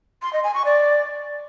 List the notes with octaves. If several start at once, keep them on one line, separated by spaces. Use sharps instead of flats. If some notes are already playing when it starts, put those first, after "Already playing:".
C6
D#5
G#5
C#6
D5